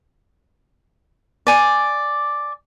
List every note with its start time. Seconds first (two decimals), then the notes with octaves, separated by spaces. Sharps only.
1.47 D5 G#5 D6